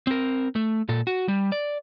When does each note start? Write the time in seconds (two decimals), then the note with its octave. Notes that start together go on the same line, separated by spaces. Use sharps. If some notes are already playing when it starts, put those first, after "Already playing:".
0.07 C4 A#4
0.55 A3
0.89 A#2 A4
1.07 F#4
1.28 G3
1.52 D5